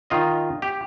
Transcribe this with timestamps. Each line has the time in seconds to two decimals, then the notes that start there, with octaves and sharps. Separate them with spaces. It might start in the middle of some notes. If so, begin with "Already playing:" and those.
0.10 D#3 F4 D#5
0.62 G4